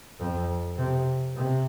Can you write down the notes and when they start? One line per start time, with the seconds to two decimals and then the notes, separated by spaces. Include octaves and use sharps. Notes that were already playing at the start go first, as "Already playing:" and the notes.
0.19 F2
0.77 C3
1.36 C3